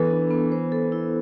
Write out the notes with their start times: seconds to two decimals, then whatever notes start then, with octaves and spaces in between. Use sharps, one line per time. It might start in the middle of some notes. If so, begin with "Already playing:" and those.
Already playing: E3 B3 A4
0.11 D4
0.31 B3
0.52 C5
0.72 A4
0.92 E4